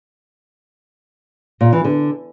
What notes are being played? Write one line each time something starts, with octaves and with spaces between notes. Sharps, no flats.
A#2
E3
D3